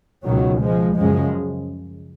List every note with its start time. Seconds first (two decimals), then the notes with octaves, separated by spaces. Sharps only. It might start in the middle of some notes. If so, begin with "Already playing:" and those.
0.25 C#2 B2 D#3 F#3
0.61 F3 G#3
0.96 F#2 C#3 F3 G#3